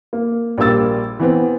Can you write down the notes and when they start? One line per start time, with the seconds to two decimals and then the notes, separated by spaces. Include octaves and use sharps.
0.13 A#3
0.58 A#1 G3 A#3 E6 A6
1.20 E3 B3 C4